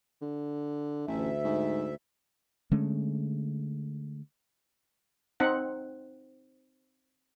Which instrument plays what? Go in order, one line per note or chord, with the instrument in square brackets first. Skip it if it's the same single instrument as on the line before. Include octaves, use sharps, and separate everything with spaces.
[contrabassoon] D3
[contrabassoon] A1 [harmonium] D2 E5
[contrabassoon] G#2
[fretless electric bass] D3 G#3 A3 C#4
[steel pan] C4 D#4 F#5